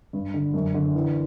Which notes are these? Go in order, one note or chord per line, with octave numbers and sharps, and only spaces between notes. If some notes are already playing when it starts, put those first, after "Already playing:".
G2
D3
F#2
D3
E3